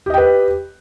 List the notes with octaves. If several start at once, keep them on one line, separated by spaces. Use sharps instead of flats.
G4 B4 D#5 G5